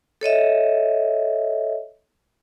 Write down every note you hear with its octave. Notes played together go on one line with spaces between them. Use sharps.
A4 C#5 D#5 E5